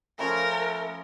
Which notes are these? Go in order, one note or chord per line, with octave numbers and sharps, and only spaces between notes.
F3 A3 C#4 A#4 B5